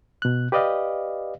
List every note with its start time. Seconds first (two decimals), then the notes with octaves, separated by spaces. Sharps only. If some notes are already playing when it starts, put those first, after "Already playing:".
0.22 B2 F#6
0.52 G4 B4 D5 D#5 F5